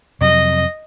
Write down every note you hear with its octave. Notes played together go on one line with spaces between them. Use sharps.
F2 C3 F#3 D#5